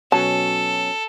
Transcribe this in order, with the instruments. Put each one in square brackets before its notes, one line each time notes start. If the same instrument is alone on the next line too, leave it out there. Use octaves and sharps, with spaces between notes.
[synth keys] B2 F#3 C#4 [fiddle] A4 [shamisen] A5